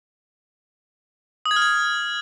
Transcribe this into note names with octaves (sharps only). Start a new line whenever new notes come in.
D#6
G#6
F6
G#6